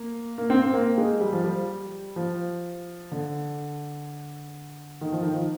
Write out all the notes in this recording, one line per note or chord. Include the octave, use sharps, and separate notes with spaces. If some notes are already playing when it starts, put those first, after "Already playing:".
Already playing: A#3
A#3
C4
C4
A#3
G#3
G3
F3
G3
F3
D3
D#3
F3
D#3
F3